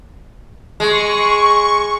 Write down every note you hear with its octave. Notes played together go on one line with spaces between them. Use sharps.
G#3 C#6